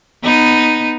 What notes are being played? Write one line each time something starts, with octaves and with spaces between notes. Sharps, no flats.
B3 D#4